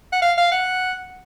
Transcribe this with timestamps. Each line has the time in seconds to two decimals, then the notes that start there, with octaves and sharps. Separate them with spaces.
0.13 F#5
0.22 F5
0.38 F5
0.52 F#5